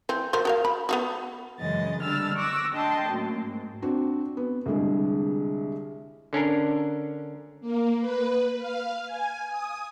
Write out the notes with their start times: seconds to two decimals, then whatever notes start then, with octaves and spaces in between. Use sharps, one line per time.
0.09 E3 C4
0.33 F#3 A#4 C5
0.45 F#4 A#4 F5
0.65 B5
0.89 B3 F4 F#4
1.60 F#2 C#3 E3 G#3 D#5 A6
2.03 D3 G3 D4 E6 F6 A6
2.37 C#6 D6 E6 F#6 A#6
2.73 D4 D#5 G5 A5 C6
3.09 F#2 A2 A#3
3.44 G#2
3.82 C4 D4 F#4
4.37 B3
4.66 C2 G2 D3 G#3 G#4
6.33 D3 C#4 D4 A#4
7.61 A#3
8.00 B4
8.58 F5
9.06 G#5
9.47 D#6